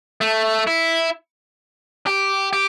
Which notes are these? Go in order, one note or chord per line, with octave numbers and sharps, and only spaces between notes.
A3
E4
G4
G4